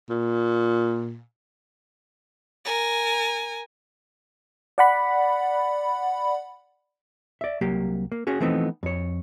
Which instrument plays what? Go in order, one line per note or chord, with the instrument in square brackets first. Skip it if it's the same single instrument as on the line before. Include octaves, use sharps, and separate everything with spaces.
[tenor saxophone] A#2
[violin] A#4 G#5
[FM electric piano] D5 F#5 B5
[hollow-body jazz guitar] D5 E5
C2 F#3 A#3 G4
A#3
C#4 F#4 G#4
E3 F3 A3 B3 C4 D#4
F2 C#5